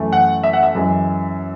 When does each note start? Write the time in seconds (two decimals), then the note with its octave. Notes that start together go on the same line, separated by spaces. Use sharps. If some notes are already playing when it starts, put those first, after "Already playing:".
Already playing: F#2 E3 A3
0.13 F#5
0.43 E5
0.53 F#5
0.63 E5
0.75 F#2 E3 G#3